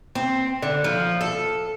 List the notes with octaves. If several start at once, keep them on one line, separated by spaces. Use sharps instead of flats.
C4
D3
F3
A4